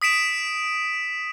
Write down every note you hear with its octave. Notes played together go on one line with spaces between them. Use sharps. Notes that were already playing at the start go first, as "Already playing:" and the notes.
D#6 B6 D7 E7